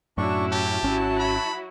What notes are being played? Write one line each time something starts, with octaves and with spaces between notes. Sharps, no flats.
F#2 A2 C#4 D4 E4 F#4 C#6
G4 A5
G#1 F#3 C#4 E4 F#4
B5